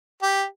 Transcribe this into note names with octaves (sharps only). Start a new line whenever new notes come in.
G4